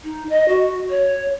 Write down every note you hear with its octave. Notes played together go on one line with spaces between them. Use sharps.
D#4
D#5
F#4
C#5